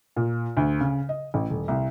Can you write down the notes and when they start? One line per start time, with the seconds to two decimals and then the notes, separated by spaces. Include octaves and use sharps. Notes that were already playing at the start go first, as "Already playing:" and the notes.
0.16 A#2
0.57 D2
0.80 C#3
1.09 D#5
1.34 A1
1.50 D#1
1.68 C2